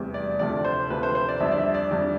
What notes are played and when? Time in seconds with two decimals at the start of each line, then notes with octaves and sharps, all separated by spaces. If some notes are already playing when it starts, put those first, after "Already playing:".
Already playing: F1 E2 C3 G3
0.14 D5
0.39 D2 C3 F3 A3 D5
0.65 C5
0.90 D2 C3 F3 A3 B4
1.03 C5
1.15 C5
1.28 D5
1.40 F2 D3 G3 E5
1.52 D5
1.58 E5
1.74 D5
1.91 F2 D3 G3